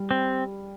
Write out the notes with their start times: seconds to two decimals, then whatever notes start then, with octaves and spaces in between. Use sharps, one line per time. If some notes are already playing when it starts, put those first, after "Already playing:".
Already playing: G3
0.11 C4